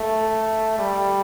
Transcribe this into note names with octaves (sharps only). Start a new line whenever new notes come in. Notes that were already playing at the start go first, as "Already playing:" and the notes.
Already playing: A3
G3